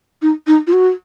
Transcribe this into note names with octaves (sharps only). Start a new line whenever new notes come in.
D#4
D#4
F4
F#4